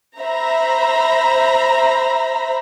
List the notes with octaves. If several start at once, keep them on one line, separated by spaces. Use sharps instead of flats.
C5 E5 A#5 B5